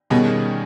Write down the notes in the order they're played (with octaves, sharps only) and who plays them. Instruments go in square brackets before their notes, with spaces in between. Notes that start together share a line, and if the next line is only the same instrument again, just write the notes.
[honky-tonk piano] B2 [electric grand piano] D#3 G3 C#4 G#4 D#5